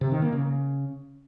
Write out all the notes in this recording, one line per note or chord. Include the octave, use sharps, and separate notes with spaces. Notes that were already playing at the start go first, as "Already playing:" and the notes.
C3
D#3
A#3
C#3